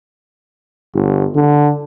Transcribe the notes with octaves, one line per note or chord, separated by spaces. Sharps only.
G1
D3